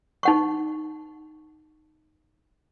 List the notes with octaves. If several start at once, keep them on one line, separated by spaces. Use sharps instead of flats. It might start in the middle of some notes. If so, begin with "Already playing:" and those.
D#4 F#5 C#6